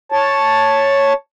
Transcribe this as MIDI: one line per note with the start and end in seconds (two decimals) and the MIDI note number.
0.12 1.13 73
0.12 1.13 81